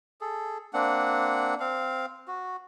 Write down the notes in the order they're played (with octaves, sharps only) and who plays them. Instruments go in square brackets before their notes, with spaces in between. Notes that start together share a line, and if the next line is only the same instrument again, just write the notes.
[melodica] G#4 A4
A#3 C4 D4 F#5
C4 F5
F#4